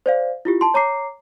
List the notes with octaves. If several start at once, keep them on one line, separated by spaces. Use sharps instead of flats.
C5 D5 F5
E4 F4 G4
A5 C6
C#5 A#5 D6 C7